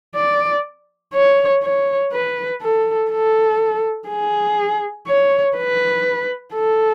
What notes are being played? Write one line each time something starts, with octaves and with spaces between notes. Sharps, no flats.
D5
C#5
C#5
B4
A4
A4
G#4
C#5
B4
A4